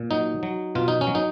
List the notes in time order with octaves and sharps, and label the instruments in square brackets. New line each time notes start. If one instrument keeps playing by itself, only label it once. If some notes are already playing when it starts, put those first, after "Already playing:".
Already playing: [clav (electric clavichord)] A#2
F#3 D#4
F#3
B2 F4
D#4
C#4
F#3
D#4